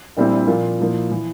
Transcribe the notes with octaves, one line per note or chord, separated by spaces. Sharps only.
A#1 A#2 G3 C4 E4
A#2 F3 A#3 F4
A#2 F3 A#3 E4
E3